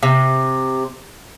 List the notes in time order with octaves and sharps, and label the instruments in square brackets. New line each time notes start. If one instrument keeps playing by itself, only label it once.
[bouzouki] C3